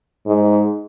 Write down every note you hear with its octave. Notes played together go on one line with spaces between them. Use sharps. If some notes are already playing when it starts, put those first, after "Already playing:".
G#2